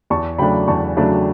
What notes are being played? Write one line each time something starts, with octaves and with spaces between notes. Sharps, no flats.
E2 A5 C#6
C#3 F#3 A3 D4 G5 B5
E2 A5 C#6
C#3 F#3 A3 D4